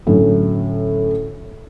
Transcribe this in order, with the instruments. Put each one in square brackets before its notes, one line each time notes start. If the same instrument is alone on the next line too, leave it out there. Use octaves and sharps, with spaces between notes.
[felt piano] A2 D3 F#3 C#4